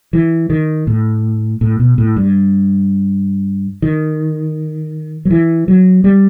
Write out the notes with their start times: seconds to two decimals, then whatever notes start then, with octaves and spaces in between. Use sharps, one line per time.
0.13 E3
0.50 D#3
0.87 A2
1.61 A2
1.80 B2
1.98 A2
2.16 G2
3.82 D#3
5.25 F#3
5.31 E3
5.68 F#3
6.04 G3